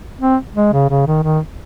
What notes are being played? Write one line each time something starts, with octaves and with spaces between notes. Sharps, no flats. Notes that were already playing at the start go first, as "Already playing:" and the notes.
C4
G#3
C#3
C#3
D#3
D#3